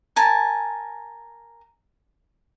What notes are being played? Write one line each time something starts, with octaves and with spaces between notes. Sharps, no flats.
A#4 G#5 A5